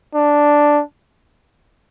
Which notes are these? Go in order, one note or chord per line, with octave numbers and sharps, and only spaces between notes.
D4